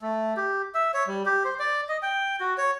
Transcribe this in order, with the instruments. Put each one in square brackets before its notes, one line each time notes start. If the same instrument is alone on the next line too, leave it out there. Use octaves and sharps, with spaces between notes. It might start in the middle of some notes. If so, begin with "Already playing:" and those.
[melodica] A3
G4
E5
C#5
G3
G4
C5
D5
D#5
G5
F#4
C#5